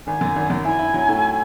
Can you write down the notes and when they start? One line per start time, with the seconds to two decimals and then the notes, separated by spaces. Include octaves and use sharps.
0.07 G#1 G#5
0.21 F#2
0.36 G#1
0.50 F#2
0.65 E4 G#5
0.79 E4
0.94 F#3
1.08 A2